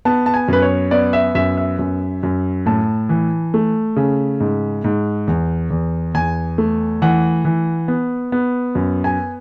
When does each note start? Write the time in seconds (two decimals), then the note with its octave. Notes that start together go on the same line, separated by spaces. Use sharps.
0.05 B3 A5
0.26 A5
0.34 G#5
0.48 F#2 B4
0.62 C#5
0.91 B3 D5
1.13 E5
1.35 F#2 E5
1.57 E5
1.79 F#2
2.23 F#2
2.66 A2 A5
3.09 E3
3.54 A3
3.96 C#3
4.40 G#2
4.84 G#2
5.27 E2
5.70 E2
6.14 E2 G#5
6.58 A3
7.02 E3 F#5
7.45 E3
7.88 B3
8.32 B3
8.75 F#2
9.04 G#5